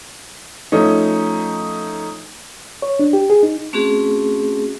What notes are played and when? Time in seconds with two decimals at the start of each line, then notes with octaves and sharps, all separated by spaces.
0.72 F3 A3 C#4 D#4
2.82 C#5
2.99 D4
3.13 G4
3.30 G#4
3.43 D#4
3.73 A3 C4 C#4 F#4 G#4